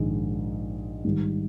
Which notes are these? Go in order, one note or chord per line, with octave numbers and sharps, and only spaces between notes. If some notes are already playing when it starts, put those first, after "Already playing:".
Already playing: A#1 G#2 D#3 G#3
G#2 D#3 G3